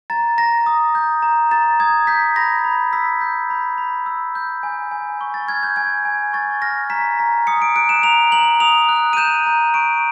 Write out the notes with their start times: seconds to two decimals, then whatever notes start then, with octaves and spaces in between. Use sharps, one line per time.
0.10 A#5 A6
0.38 A#5 A#6
0.66 D#6
0.95 G6
1.23 A#5
1.51 A#5 A6
1.80 D#6 G#6
2.07 G6 B6
2.36 B5 A#6
2.64 B5
2.93 E6 B6
3.21 G6
3.50 B5
3.78 B5
4.06 E6
4.35 G6
4.63 G#5
4.91 G#5
5.21 C#6
5.34 A6
5.48 F6 G#6
5.63 G6
5.76 G#5 G#6
6.05 G#5
6.33 C#6 A6
6.62 F6 A#6
6.90 A#5 B6
7.19 A#5
7.47 D#6 C#7
7.62 D7
7.76 F#6 D7
7.89 E7
8.03 A#5 F7
8.32 A#5 F#7
8.60 D#6 F7
8.89 F#6
9.13 D#7
9.17 G6 E7
9.46 A#5
9.74 C#6 D7